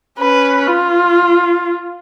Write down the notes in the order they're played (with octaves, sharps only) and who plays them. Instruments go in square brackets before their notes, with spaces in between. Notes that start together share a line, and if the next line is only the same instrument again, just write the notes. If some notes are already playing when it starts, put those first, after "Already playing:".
[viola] C#4 [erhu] B4
[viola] F4